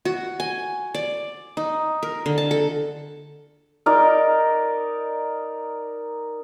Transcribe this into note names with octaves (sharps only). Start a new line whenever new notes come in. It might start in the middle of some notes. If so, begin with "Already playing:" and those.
F#4
G#5
D5
D#4
A#4
D3
A5
A4
D#4 A#4 D5